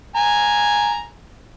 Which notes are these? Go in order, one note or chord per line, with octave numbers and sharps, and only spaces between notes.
G#5 A#5